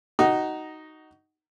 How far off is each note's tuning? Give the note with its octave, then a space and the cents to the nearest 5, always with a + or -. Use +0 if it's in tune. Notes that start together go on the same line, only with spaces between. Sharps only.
D#4 +0 F#4 +20